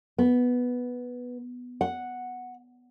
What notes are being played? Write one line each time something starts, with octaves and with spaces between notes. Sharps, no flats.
B3
F#5